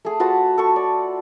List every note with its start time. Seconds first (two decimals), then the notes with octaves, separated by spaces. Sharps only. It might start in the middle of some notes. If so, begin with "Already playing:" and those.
0.05 A3 G#4
0.20 F4 F#4 B4 A5
0.58 A4 C#6
0.76 D5